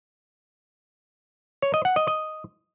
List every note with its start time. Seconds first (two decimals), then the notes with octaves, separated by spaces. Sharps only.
1.62 C#5
1.74 D#5
1.85 F#5
1.96 D#5
2.08 D#5